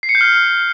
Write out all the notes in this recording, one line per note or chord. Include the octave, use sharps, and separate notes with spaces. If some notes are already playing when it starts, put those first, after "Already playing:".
C7
C#7
G6
F6